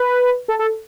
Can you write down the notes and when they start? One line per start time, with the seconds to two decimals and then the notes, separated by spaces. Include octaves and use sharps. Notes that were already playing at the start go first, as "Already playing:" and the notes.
Already playing: B4
0.48 A4
0.59 A4